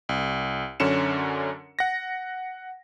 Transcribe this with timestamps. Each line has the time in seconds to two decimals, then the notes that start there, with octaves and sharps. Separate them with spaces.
0.09 C2
0.80 F#2 D3 C#4 C#7 E7
1.79 F#5 A#6